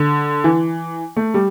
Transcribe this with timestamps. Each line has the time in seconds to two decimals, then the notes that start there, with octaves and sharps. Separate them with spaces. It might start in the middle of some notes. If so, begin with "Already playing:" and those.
Already playing: D3
0.44 E3
1.17 A3
1.34 G3